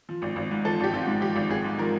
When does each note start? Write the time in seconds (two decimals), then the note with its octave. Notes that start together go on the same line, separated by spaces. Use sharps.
0.09 F3
0.22 G#1
0.36 G#1
0.51 G#2
0.65 F3 A4
0.80 G#1 G4
0.93 G#1 F4
1.03 G#2 F#4
1.21 F3 G4
1.36 G#1
1.50 G#1 G#4
1.64 G#2
1.79 F3 A#4